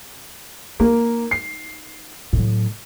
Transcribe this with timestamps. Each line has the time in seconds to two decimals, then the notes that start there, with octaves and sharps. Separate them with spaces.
0.80 A#3 D#4
1.31 C7
2.33 A2 F#3